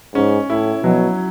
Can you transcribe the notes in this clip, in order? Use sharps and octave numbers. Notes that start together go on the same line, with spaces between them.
G#2 C#4
A2 E4
B2 F#3